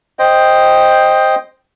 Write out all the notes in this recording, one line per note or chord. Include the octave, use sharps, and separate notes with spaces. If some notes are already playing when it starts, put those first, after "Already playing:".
C5 D#5 G5